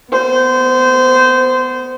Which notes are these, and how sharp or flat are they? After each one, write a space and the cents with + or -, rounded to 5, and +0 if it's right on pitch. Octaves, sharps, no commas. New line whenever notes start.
B3 +20 C5 -20